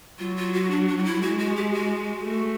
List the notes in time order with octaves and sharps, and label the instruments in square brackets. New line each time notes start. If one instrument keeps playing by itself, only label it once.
[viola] F#3 [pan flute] F4
[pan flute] F4
F#4
D4
D4
F4
E4
[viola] G#3 [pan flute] F#4
[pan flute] F#4
G4
F#4
[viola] A3